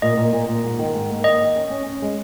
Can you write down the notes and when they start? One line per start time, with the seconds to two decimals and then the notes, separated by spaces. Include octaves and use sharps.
0.02 A#2 D#5
0.17 A#2
0.33 A#2
0.48 A#2
0.64 G#2
0.79 D#3
0.94 G#2
1.10 A#3
1.24 D#3 D#5
1.41 D#3
1.56 C#4
1.70 C#4
1.86 C#4
2.02 G#3